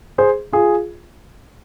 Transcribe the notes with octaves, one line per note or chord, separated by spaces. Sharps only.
G#4 C5
F4 G#4